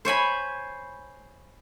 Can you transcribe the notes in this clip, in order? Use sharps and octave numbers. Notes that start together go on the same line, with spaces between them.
C5 C#5 G#5 B5